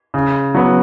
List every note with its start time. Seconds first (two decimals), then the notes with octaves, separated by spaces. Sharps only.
0.14 C#3
0.55 F#3 B3